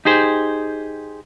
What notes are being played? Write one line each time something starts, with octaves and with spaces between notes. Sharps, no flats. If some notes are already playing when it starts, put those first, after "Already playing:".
D#4 G4 G#4 C5